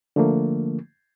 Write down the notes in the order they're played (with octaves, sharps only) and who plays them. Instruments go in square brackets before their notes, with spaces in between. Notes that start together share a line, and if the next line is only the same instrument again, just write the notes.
[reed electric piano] D3 F3 A3 A#3